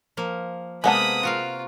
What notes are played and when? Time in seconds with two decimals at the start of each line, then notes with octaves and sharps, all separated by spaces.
0.17 F3 A#3
0.84 C3 G#3 A#3 B3 F#5 A5 B5 D#6
1.23 F4 F#4 A#4 F5